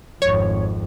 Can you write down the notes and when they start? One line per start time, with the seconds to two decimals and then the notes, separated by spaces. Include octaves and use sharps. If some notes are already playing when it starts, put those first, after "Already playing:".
0.22 G#1 F2 C#5